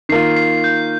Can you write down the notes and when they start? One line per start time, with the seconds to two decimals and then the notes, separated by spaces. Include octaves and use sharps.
0.09 D#3 A#3 F4 C7
0.36 C7
0.64 G6